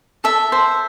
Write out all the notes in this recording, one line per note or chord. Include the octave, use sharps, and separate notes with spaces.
A4 E5
C5